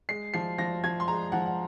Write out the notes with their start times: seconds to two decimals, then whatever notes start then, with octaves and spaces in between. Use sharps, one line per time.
0.09 G#3 C7
0.34 F3 C7
0.58 F3 A#6
0.84 F3 G#6
1.00 C6
1.08 G#3 A#5
1.32 F3 F#5
1.46 F#5